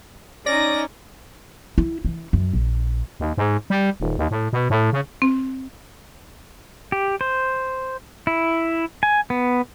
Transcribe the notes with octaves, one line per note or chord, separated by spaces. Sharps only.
C#4 D#4 D5 A#6
E4
E3
F#2
A#1
D#2
G#2
G3
D#1
D#2
A2
B2
A2
C#3
C4
G4
C5
E4
G#5
B3